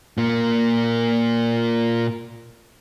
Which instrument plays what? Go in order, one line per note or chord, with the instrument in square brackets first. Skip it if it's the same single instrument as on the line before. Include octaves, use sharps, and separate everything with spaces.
[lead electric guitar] A#2 A#3